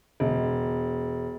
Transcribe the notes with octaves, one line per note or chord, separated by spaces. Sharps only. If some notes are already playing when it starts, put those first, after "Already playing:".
E1